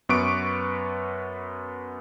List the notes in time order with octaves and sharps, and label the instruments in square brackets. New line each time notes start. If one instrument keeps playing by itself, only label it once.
[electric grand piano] F#2 B3 B4 C#6 D6 D7